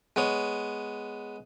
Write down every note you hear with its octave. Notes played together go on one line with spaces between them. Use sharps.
G#3 B3 C#5